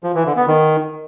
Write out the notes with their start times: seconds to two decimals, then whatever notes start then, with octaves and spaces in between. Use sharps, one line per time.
0.04 F3
0.15 E3
0.25 D3
0.36 B3
0.47 D#3